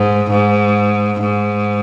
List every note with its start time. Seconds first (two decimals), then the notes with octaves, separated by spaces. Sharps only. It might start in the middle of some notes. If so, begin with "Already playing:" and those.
Already playing: G#2
0.31 G#2
1.21 G#2